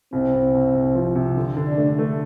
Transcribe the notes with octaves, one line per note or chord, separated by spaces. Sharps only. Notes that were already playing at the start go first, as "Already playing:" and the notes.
C2 C4
C2
C2
C2
F3
C3
D3
D3
D4
A3
A3